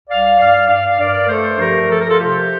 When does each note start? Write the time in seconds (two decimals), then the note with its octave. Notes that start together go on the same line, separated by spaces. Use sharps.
0.08 C2 D5 F5
0.39 G2 D5 F5
0.69 G2 D5 F5
0.99 G2 A#4 D5
1.29 A3 A4 C5
1.59 F3 G4 A#4
1.89 F3 A4
1.99 A#4
2.09 F4 A4
2.19 C3 G4